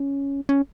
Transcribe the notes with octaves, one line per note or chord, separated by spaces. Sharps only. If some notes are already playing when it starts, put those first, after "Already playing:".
Already playing: C#4
C#4